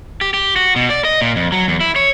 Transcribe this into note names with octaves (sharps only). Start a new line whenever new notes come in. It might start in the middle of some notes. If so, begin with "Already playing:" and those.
G4
G4
F#4
B2
D5
D#5
A#2
F2
F#3
E2
E4
C#5